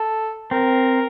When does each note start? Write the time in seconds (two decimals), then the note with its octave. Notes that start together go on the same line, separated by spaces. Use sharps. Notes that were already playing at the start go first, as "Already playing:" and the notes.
Already playing: A4
0.51 C4 A#4